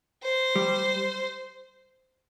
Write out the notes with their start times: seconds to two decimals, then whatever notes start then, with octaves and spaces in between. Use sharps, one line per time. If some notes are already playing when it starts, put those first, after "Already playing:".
0.23 C5
0.56 G3